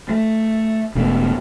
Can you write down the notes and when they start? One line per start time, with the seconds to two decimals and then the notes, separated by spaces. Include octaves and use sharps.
0.09 A3
0.95 E1 B2 A3